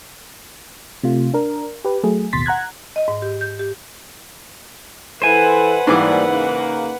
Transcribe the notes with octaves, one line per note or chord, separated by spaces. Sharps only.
C3 A3 F4
D4 A#4
G4 B4
F#3 A3 G#4
A1 D#2 B2 C6 A6 B6
F#5 A#5 F#6 G#6
D#5
G#2
G4
G6
G4
E3 E4 A4 B4 C5 F#5 G#5
G#2 E3 G3 A#3 D6
C#3 A#3 D#4